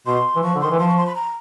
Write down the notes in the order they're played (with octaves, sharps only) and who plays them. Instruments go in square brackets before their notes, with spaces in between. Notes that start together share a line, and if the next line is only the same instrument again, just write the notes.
[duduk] B2 [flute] C6
[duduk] E3
[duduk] F3 [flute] C#6
[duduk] D3
[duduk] D#3 [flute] C6
[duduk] E3
[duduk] F3 [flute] C6
[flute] C#6
C6
B5
A#5